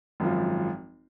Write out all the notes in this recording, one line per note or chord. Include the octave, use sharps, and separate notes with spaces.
G#1 F#2 F3